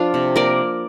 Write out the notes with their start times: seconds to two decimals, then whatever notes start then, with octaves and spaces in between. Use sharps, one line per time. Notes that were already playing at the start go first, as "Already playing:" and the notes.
Already playing: F3 D4 F4
0.14 C3
0.36 A#3 A#4 D5